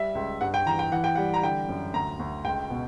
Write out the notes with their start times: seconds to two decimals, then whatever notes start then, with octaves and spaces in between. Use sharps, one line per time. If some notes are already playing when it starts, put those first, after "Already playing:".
Already playing: G3 E5
0.15 C#2
0.41 G2 F#5
0.54 G5
0.66 E3 A#5
0.79 G5
0.92 E3 F#5
1.04 G5
1.15 G3 F#5
1.34 A#5
1.43 D3 G5
1.69 F#2
1.94 D2 A#5
2.20 D2
2.45 C#2 G5
2.70 B2